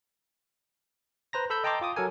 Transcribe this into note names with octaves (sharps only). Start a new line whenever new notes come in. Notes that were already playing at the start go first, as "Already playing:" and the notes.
B4 C5 A#5 A#6
A4 B5 E6 G6
D#5 G5 A5 A#5 C6 D6
F4 D6 D#6
F#3 A4 A#4 G#5